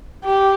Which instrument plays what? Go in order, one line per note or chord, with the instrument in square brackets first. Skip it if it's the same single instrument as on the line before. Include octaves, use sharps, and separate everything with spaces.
[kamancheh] G4